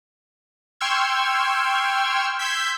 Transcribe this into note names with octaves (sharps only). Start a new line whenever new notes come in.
G5 C6 C#6 E6 F6 G#6
C6 E6 G6 G#6 B6